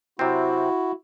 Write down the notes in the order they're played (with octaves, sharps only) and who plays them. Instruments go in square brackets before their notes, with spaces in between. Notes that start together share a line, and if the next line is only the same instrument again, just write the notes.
[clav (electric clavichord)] C3 F#3 C4 [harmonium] E4 F#4